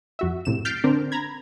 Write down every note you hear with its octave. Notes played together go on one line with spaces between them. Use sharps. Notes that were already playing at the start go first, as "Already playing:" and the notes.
F2 F#4 E5
A1 A2 C3 E7
F6 G6 A6 B6 C7 D7
D3 C4 D4 A#4
A#5 B5 G#6